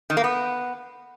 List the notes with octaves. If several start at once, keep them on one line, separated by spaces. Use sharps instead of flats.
D#3
A#3
B3